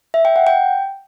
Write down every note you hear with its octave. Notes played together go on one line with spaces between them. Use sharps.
E5
G5
F#5
G5